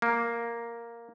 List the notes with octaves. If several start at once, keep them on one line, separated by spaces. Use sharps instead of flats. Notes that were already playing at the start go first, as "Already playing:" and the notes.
A#3